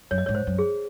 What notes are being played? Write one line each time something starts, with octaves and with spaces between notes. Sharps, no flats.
F#2 C#5
D#5
G#2 C#5
C5
F#2
G#4